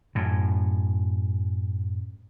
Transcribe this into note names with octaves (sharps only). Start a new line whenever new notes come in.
F#2 A2